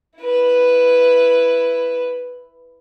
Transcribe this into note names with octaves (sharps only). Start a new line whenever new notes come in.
E4 B4